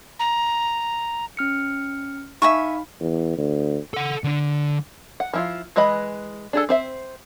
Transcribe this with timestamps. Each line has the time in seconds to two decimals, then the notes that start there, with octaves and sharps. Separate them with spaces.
0.19 A#5
1.37 C#4 F6 C#7
2.42 D#4 E5 F5 G#5 B5 C#6
3.00 E2
3.37 D2
3.94 A4 F#5
4.24 D3 D4
5.20 F#5
5.33 F3 E4 F4
5.76 E3 G#3 B4 D#5 B5
6.53 D4 G#4 A4
6.69 C4 C5 E5